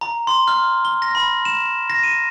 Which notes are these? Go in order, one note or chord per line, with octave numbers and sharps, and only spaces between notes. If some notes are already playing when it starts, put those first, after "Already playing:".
A#5
C6
F6
G7
A#6
B5
E7
A#6
D#7